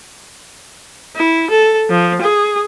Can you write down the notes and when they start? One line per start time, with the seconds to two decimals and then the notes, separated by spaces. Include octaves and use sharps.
1.16 E4
1.50 A4
1.90 F3
2.22 G#4